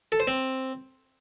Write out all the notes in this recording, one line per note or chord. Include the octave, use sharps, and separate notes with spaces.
A4
C5
C4